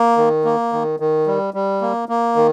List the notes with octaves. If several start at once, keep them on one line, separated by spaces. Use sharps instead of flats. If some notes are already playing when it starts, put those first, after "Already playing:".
Already playing: A#3
D#3
A#3
D#3
D#3
G3
G3
A#3
A#3
D#3